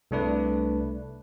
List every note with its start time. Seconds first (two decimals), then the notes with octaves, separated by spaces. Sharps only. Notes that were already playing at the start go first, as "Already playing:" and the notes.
0.11 C2 A3 D4 B4